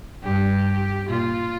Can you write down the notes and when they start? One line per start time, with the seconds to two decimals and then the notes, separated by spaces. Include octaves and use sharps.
0.23 G2 G4
1.09 A#2 F4